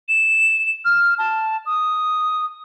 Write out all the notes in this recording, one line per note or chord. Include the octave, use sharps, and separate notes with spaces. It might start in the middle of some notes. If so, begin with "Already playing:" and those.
E7
F6
A5
D#6